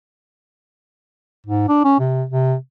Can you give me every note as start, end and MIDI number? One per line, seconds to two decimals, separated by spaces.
1.46 1.68 44
1.68 1.83 62
1.85 1.98 61
2.00 2.24 48
2.29 2.55 48